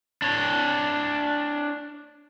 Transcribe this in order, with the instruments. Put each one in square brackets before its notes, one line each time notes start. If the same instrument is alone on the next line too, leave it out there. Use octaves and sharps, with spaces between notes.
[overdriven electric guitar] D4 C#5